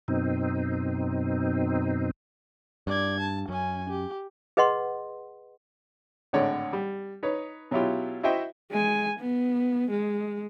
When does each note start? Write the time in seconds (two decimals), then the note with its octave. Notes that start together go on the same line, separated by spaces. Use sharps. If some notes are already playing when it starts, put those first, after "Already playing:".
0.08 F#2 B2 C4 D#4
2.87 G2 D5 G#6
3.20 A5
3.49 F#2 C#4 G#5
3.89 G4
4.57 G#4 B4 D#5 F#5 C6
6.33 G#1 A2 D3 G#3 C#5 D5
6.73 G3
7.23 D#4 B4 C#5
7.71 B2 F#3 C#4 E4 F4 G4
8.23 E4 F#4 C5 D#5 E5 G5
8.71 G#3 G#5
9.19 B3
9.90 G#3